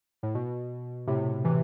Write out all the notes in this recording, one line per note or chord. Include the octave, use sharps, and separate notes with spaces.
A2
B2
A2 C3
C3 E3